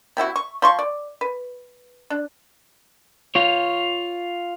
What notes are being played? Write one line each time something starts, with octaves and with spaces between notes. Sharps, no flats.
C3 C4 E4 F#4
C#6
F3 C6 C#6
D5
B4
D4
F4 C#5